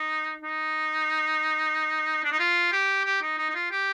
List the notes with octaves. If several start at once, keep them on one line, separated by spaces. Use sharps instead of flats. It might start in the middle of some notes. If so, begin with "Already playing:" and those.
Already playing: D#4
D#4
D4
D#4
F4
G4
G4
D#4
D#4
D#4
F4
G4